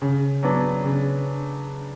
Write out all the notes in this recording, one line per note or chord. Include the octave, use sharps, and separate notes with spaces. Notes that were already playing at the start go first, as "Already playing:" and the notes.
C#3
F#3 B3 D4
C#3